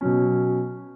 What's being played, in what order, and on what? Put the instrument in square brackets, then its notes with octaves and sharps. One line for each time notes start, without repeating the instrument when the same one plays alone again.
[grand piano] B2 F#3 C#4